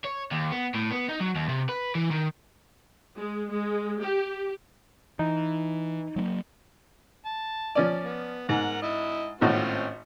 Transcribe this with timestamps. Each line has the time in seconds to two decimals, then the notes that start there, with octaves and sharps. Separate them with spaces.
0.05 C#5
0.32 D#2
0.52 B3
0.75 A2
0.91 B3
1.09 D#4
1.21 F#3
1.36 D#2
1.49 C3
1.69 B4
1.95 E3
2.11 D#3
3.18 G#3
3.51 G#3
4.03 G4
5.19 E3 D#4
6.16 F#3 G#3 A#3
7.26 A5
7.75 F3 C#4 D5
8.04 B3
8.49 G#2 A#4 F#5
8.83 E4 D#5
9.41 G#1 A2 C4 C#4 F4 F#4